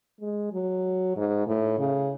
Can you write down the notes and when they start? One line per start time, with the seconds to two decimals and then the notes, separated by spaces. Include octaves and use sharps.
0.21 G#3
0.52 F#3
1.16 G#2
1.47 A2
1.79 C#3